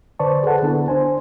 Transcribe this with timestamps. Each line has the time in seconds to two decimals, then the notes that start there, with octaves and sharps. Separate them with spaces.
0.19 D3 B4 C5 D5 A5 C#6
0.44 G#4 A4 B4 F#5 A5
0.62 D3 B3 D4 E4
0.88 D4 C5 G#5